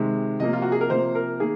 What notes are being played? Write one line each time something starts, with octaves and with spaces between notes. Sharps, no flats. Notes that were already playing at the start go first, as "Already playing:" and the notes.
Already playing: C3 D#3 G#3
C3 F3 A#3 D#5
F4
F#4
G#4
A#4
C3 F3 A#3 C5
A#4
D#3 A#3 G#4